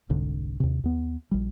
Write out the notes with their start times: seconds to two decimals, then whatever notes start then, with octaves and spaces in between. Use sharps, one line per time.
0.09 F1 C2 G#2 D3
0.60 D#2 C3
0.84 D#2 B3
1.31 A#1 G3